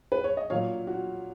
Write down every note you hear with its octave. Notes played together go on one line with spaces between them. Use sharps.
B4
C#5
D#5
A#2 F#3 C#5 F5
F#4